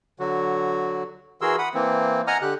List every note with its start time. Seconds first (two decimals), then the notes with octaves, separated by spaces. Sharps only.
0.19 D3 F#3 F#4
1.41 E3 F#4 G#4 A#4 C6 E6
1.58 F#5 B5 D#6
1.74 E3 A#3 C4
2.27 D#5 F#5 G#5 A#5 D#6 F6
2.42 D3 G4 F#6